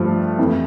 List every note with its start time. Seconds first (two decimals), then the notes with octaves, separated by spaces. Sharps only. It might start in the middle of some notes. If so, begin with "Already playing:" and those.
Already playing: G2 F3 A3
0.38 F2 E3 A3